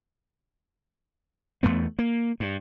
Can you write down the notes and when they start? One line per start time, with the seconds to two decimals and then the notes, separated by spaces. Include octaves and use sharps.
1.63 E2 A2 A3 B3
1.99 A#3
2.40 G2